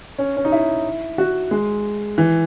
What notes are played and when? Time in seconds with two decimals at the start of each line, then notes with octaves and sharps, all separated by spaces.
0.18 C#4
0.37 C#4
0.45 D#4
0.52 E4
1.18 F#4
1.51 G#3
2.18 E3